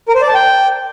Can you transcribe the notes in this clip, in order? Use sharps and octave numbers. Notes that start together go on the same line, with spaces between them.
A#4
C5
D5
A5
G5